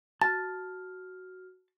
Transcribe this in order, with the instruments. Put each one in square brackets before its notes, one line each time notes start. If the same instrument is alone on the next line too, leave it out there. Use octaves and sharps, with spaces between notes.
[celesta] F#4 F6 [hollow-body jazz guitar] A5 [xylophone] A6